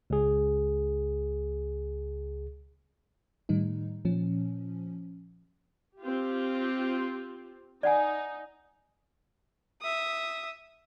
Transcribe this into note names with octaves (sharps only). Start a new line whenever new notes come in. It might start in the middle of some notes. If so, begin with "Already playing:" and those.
C#2 G#4
A2 D#3 G3 D#4
A#2 F3 C#4
C4 F4 G4
D#4 D5 F#5 G#5
E5 D#6